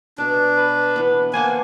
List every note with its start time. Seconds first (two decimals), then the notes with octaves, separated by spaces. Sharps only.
0.18 B2 D4 D5
0.57 B4
0.96 E3 B3
1.34 A#3 C5 F#5 G#5 A5